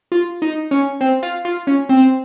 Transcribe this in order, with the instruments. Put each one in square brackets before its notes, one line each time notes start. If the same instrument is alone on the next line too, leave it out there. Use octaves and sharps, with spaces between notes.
[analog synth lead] F4
D#4
C#4
C4
F4
F4
C#4
C4